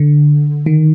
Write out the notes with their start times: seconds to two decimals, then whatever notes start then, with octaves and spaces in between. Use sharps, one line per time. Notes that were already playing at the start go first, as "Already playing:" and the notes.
Already playing: D3
0.66 D#3